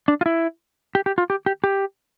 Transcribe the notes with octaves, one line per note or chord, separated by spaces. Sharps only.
D4
F4
E4
G4
G4
F4
G4
G4
G4